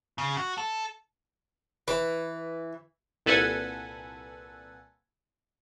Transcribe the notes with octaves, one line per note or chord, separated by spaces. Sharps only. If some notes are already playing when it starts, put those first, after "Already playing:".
C#3
F#4
A4
E3 B4
C2 A#2 A4 B4 F#5 G#5